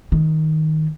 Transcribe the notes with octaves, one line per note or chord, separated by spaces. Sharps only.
D#3